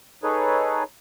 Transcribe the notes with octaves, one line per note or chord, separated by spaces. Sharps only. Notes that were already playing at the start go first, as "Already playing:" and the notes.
D#4 G#4 A4 B4 C#5